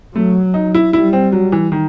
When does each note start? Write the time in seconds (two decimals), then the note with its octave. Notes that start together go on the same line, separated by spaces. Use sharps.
0.15 F#3 A3
0.54 D#4
0.74 E4
0.93 G3 E4
1.13 C4
1.32 F#3
1.52 E3
1.72 D#3